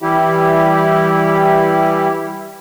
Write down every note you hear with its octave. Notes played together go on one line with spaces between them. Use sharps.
E3 G3 E4 G4